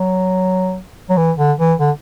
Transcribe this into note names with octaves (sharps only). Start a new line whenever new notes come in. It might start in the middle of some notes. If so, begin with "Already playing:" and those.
Already playing: F#3
F#3
E3
D3
E3
D3